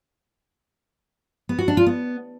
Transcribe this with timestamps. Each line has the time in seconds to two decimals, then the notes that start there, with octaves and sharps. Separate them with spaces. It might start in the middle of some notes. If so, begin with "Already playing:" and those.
1.49 B3
1.59 F#4
1.68 D4
1.77 F4
1.86 B3